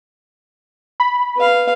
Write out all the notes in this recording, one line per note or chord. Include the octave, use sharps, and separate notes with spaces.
B5
B4 F5